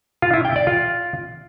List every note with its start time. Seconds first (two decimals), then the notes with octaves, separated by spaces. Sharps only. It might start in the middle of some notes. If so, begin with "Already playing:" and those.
0.22 F4
0.34 E4
0.45 G5
0.56 D5
0.67 F4